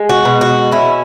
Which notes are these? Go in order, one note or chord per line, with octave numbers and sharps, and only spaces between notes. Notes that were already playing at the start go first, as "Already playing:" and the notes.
Already playing: G#3
F#4
B2
F#4
C#4 E4